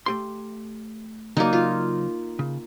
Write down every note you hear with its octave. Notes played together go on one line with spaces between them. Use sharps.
A3 G4 C6
C#3 F#3 A#3 D#4 D5
F4
C#3